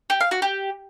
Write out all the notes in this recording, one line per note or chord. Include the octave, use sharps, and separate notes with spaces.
G4
F5
F#4
G4